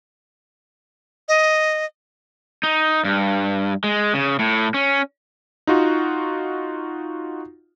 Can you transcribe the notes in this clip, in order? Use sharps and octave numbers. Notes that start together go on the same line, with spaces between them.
D#5
D#4
G2
G#3
C#3
A2
C#4
D#4 F4 F#4